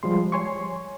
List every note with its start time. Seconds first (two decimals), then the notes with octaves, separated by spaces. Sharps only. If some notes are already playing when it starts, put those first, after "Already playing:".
0.03 F3 G3 G#3 C6
0.32 C#5 G#5 C6 C#6